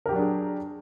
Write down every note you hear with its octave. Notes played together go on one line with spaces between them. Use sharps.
F#3 D4 G4 G#4 A#4